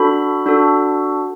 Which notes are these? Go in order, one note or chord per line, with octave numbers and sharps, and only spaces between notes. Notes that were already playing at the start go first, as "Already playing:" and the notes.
Already playing: D4 F#4 A4 B5
D4 F#4 A4